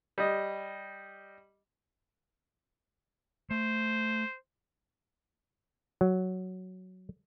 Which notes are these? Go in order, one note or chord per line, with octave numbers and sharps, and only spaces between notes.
G3 D#5
A3 C5
F#3